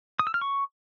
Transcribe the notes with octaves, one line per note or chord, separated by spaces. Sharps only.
D#6
E6
F6
C#6